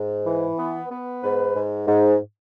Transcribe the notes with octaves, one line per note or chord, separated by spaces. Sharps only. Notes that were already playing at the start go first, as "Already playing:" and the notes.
Already playing: G#2
E3
B3
B3
G#2 B4
G#2
G#2